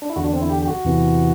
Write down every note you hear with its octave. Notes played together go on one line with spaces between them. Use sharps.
D4
E4
E2 D3 F#4
D4
C4
E4
G4
G4
F#4
E2 C3 E3